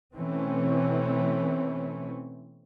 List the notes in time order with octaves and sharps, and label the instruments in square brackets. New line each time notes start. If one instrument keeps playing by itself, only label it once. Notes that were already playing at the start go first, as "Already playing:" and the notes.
[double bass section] B2 E3 A3 C4 C#4